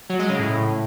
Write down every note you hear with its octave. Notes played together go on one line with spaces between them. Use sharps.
F#3
G#3
C#3
A2